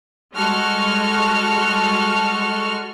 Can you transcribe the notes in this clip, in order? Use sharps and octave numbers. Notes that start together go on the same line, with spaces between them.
G3 G#3 F#4 A4 C#6 F6